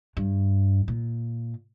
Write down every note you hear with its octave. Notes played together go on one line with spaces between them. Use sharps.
G2
A#2